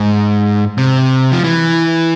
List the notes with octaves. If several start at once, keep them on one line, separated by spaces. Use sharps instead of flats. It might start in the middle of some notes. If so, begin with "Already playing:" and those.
Already playing: G#2
C3
F3
E3